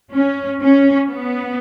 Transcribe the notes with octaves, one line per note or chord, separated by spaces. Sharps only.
C#4
C#4
B3